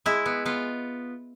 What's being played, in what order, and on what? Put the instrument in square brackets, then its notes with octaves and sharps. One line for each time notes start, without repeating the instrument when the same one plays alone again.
[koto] G#3 E4
B3
B3 F4